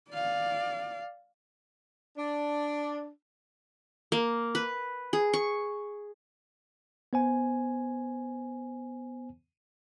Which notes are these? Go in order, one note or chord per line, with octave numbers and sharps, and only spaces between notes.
D5 F5
D4
A#3
B4
G#4
C#6
B3 C5 G#5